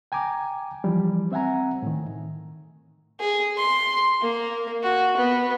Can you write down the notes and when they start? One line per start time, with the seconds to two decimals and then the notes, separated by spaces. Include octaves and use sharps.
0.12 G5 G#5 A#5 D6
0.84 E3 F3 G3
1.32 C4 E5 F#5 G#5 A#5
1.82 A2 D#3
3.20 G#4
3.58 C6
4.22 A#3
4.83 F#4
5.17 B3